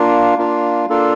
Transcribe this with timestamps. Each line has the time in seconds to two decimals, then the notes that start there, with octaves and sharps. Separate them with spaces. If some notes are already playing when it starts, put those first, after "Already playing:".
Already playing: A#3 D4 F4
0.38 A#3 D4 F4
0.90 A#3 D4 F4 A4